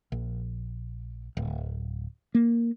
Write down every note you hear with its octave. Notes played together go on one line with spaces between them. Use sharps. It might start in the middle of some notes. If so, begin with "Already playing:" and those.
A#1
D1
A#3